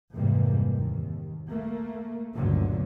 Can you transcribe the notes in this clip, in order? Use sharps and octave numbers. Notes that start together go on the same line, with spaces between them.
F2 G#2 C3 E3 G3 A#3
D#2
A3 A#3
G1 D2 G2 A#2 D3 F#3